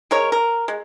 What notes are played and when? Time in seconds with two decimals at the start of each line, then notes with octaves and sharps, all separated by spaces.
0.11 G#3 A#4 C#5
0.32 A#4
0.68 G#3